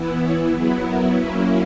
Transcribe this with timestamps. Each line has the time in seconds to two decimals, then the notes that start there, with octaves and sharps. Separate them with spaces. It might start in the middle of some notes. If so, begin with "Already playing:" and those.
Already playing: E3 B3 E4
0.20 C#5
0.53 F#3 B3 E4 G#4
0.86 A#4
1.18 F#3 A#3 C#4 E4 B4